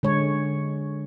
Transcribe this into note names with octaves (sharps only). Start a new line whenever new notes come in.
D3 G#3 C#5